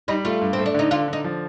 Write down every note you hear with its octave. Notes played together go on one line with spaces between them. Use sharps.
G3 D#4
A3 F4
G2
C4
A3
D4
D3 D#4
D3 F4
D3 D#4
F3